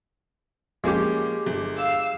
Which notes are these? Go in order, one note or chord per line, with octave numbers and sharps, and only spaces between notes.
F3 G#3 A#3 C#4 G4
G1
F5 E6